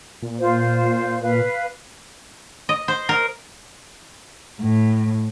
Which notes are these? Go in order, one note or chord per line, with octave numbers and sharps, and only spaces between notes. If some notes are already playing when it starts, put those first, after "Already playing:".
A#2
F4 C5
B4 F5
D#5
C5
A#4
A2